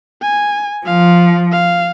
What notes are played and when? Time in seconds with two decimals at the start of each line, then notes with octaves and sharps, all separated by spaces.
0.22 G#5
0.86 F3 F5
1.52 F5